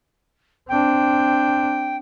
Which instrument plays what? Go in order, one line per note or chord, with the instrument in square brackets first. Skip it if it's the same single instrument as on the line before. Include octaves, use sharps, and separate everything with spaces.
[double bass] C4 D4 [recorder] G5